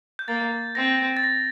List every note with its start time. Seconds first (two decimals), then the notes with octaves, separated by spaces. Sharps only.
0.19 G6
0.28 A#3 A6
0.75 C4 A#6
1.17 A6
1.24 A#6